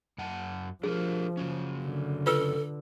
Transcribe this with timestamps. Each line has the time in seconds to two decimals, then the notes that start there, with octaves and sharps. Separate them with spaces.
0.18 F#2 F#5 A5
0.83 F3 D4 G4 G#4 A#4
1.37 C#3 F#3 C#4
1.85 D3
2.26 F4 A4 B4 E6